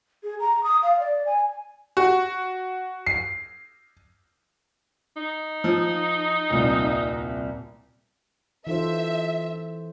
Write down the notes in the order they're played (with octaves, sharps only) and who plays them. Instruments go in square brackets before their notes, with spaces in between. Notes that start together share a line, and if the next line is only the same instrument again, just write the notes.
[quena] G#4
A#5
D#6
F5
D5
G#5
[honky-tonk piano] F#4
C7
[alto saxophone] D#4
[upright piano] F3
D#1 C2
[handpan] E3 A4 C5 [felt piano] D#4 F4 [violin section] E5